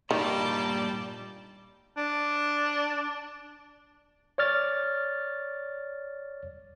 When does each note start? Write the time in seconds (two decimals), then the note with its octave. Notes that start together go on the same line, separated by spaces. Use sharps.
0.11 G2 A#2 D#3 G3 D5 G5 A5
1.97 D4
4.38 C#5 D5 F6 A6